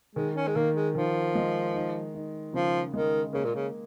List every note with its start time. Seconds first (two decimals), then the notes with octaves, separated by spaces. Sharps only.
0.15 D#3 G#3
0.36 C#4
0.47 G#3
0.55 D#3 A#3
0.75 G#3
0.95 D#3 F3
1.35 G#3
1.74 D#4
2.14 D#4
2.53 C#3 F3
2.94 D#3 G#3
3.33 C#3 A#3
3.44 A#2
3.55 C#3